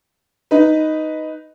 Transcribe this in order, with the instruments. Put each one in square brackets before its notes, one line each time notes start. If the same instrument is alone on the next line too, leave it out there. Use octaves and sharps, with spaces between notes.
[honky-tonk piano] D#4 B4